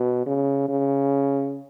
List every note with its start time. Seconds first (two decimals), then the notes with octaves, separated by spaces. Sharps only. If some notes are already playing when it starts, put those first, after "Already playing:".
Already playing: B2
0.26 C#3
0.69 C#3